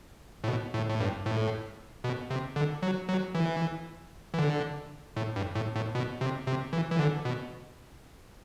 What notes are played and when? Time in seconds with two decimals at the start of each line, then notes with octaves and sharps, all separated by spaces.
0.44 A2
0.48 B2
0.74 A2
0.89 A2
1.00 G2
1.26 A2
2.04 B2
2.30 C3
2.56 D3
2.82 F#3
3.09 F#3
3.35 E3
4.34 E3
4.39 D3
5.17 A2
5.36 G2
5.55 A2
5.76 A2
5.95 B2
6.21 C3
6.47 C3
6.73 E3
6.91 E3
6.99 D3
7.25 B2